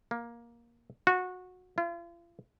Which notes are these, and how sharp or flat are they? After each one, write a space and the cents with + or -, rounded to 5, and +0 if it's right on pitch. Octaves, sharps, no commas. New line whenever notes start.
A#3 +15
F#4 -20
F4 -40